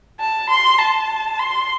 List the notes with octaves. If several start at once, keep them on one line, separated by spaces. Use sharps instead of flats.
A5
C6
A5
C6